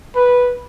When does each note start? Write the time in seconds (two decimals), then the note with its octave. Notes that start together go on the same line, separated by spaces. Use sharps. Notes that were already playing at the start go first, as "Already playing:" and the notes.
0.16 B4